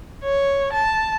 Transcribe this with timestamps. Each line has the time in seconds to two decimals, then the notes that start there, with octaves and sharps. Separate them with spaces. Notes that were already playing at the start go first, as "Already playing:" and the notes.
0.24 C#5
0.73 A5